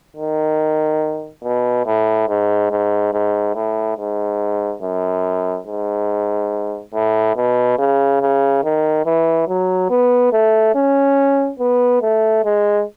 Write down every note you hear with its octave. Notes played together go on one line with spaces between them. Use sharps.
D#3
B2
A2
G#2
G#2
G#2
A2
G#2
F#2
G#2
A2
B2
C#3
C#3
D#3
E3
F#3
B3
A3
C#4
B3
A3
G#3